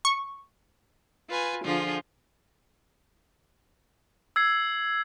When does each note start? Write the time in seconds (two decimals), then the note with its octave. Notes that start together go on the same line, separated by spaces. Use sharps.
0.05 C#6
1.29 F4 B4 G#5
1.64 D3 F3 F4 G#4
4.36 E6 G#6 C7